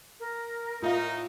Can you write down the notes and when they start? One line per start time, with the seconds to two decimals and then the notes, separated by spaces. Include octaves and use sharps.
0.19 A#4
0.82 A2 D#4 F4 E5 F5